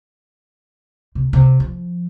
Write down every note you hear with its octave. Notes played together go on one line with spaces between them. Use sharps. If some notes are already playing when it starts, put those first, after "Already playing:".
C3
C3
F3